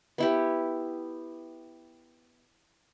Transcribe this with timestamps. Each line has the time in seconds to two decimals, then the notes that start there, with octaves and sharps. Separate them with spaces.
0.18 B3 E4 G4